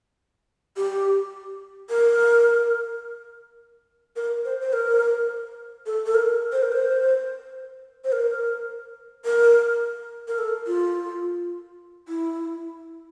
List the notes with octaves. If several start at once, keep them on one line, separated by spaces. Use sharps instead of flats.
G4
A#4
A#4
C5
C5
A#4
A4
A4
A#4
C5
A#4
C5
C5
A#4
A#4
A#4
A4
F4
E4